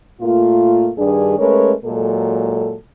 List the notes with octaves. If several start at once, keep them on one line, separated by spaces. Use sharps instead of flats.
A#2 A3 A#3 F4
G2 D#3 G3 D4 G#4
G#3 A3 C#4 A#4 B4 C#5
A#2 F#3 G#3 A4